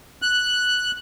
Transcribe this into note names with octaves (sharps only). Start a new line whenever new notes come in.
F#6